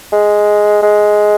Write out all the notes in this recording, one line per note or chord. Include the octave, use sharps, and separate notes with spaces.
G#3
G#3